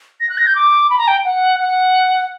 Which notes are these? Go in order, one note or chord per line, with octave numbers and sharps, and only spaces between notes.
A#6
F#6
A#6
G6
D6
B5
A#5
G5
F#5
F#5